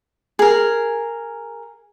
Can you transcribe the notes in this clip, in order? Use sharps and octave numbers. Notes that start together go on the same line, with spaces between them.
G#4 A#4